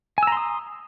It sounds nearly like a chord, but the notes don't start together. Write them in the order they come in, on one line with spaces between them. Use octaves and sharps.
G#5 E6 A#5 C6 D#6